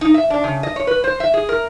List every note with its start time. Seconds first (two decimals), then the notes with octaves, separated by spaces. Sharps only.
0.01 D#4
0.14 E5
0.30 D4
0.44 C#3
0.63 D#5
0.76 C#5
0.87 B4
1.04 C5
1.20 E5
1.34 G#4
1.49 A#4